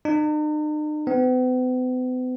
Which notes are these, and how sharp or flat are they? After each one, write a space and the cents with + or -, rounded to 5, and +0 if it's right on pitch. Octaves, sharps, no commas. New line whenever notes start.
D#4 -45
B3 +45